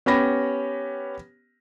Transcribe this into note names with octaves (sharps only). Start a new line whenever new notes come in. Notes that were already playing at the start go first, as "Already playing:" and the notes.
B3 C#4 G4 B5 A#6